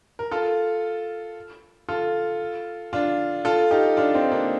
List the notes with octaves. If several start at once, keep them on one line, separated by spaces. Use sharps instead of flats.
A#4
F4 A4
F4 A4
D4 F4
F4 A4
D#4 G4
D4 F4
C4 D#4
A#3 D4